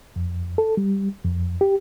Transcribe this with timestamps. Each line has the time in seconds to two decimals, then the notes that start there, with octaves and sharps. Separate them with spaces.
0.16 F2
0.58 A4
0.77 G3
1.24 F2
1.61 G4